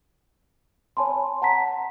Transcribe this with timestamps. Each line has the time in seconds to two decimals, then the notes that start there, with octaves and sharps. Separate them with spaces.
0.97 C#5 G#5 A5 B5 C6
1.42 F#5 A5 A#5 B6